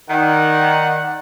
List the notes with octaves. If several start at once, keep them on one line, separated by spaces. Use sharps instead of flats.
D#3 D5 F#5